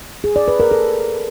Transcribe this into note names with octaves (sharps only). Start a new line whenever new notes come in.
G#4
D5
B4
A#4
A4